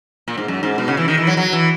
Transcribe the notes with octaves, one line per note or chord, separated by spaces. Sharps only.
A#2
G#2
F#2
G#2
B2
C#3
E3
D#3
E3
F#3
F#3
E3